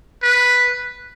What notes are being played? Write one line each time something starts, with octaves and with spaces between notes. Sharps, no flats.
B4